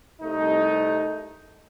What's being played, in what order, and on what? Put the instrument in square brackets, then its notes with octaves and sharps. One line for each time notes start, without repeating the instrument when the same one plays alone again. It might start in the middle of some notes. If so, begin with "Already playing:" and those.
[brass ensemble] C2 A3 D#4